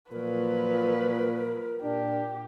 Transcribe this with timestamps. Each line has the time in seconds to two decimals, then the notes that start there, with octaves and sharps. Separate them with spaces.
0.12 A#2 F3 F#3 A#4 B4
1.83 A#2 D4 G4